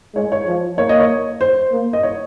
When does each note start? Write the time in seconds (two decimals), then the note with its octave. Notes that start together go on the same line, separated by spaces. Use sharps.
0.15 G#3 C#5
0.32 C#5
0.46 F3
0.78 A#3 C#5
0.89 D#5
1.00 C#5
1.41 C5
1.72 A#3
1.93 D#5
2.03 C#5